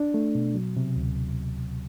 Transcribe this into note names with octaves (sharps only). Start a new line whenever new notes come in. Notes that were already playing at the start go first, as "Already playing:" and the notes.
Already playing: D4
A3
B2
F#3
C3
D2